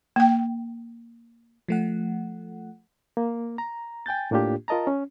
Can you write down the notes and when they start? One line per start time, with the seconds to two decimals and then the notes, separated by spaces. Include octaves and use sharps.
0.16 A#3 G5
1.68 F3 A3 F#5
3.17 A#3
3.58 A#5
4.06 G5 G#5 G6 A6
4.31 A2 A#3 D4 F4 G4
4.68 F4 A#4 D#5 A5 A#5
4.87 C#4